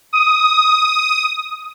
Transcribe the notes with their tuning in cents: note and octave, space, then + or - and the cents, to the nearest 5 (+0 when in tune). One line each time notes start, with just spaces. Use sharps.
D#6 +10